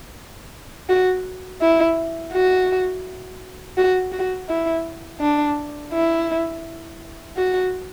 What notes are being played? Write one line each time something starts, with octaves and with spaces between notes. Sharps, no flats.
F#4
E4
F#4
F#4
F#4
E4
D4
E4
F#4